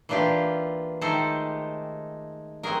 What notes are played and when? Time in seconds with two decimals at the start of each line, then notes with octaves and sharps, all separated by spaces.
0.09 E3 A#3 D4 F4 G4
1.01 D#3 G#3 A3 G4 A4 C5
2.63 C4 F#4 G#4 A#4